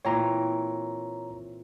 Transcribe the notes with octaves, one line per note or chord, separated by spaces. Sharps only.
A#2 E3 C4 C#5 A#5